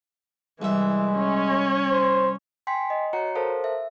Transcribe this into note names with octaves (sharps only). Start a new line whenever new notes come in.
C2 E3 G#3 E5
C#4 C#5
C5
G5 G#5 C6 B6
D#5
F#4 C#5 F#5 A#5 C#7
A4 A#4 C5 F5 A5
E5